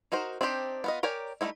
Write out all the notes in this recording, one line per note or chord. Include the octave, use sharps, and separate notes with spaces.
D#4 F#4 A#4 C5
C4 D4 D#4 G4 C5
B3 F4 D#5
G4 A#4 C#5 D5 G#5
G3 A3 C4 D#4 E4